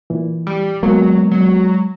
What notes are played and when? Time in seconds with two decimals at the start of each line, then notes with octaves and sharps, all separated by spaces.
0.10 A#2 E3
0.47 G3
0.83 F#3 G#3 A#3 B3
1.31 F#3